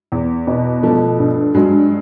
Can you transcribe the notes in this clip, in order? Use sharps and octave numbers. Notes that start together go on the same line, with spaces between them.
E2
B2
F3 A3
G2
G2 F#3 G#3